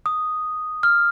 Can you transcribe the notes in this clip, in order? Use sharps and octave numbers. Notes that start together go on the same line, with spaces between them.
D#6
F6